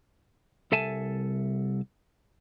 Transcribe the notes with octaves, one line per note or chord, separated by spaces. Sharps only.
C2 A4 E5 G#5 A5